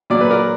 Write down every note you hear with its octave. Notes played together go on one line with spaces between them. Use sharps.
A#2 F#3 D5
B4
A#4 D5